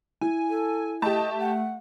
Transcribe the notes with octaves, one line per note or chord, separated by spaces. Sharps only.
E4 G#5
A4
A3 G4 D#5 A5
F#5